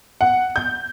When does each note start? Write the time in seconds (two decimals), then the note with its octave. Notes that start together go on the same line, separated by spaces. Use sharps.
0.21 F#5
0.56 G6